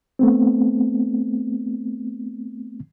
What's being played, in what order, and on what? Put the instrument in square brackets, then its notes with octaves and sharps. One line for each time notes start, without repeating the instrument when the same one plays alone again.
[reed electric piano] A3 B3 C4